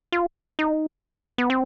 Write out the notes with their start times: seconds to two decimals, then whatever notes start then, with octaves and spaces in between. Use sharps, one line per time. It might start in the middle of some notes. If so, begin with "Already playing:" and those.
0.12 F4
0.59 D#4
1.38 B3
1.50 C4